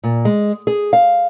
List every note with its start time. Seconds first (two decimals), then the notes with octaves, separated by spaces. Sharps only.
0.04 A#2
0.25 G#3
0.67 G#4
0.93 F5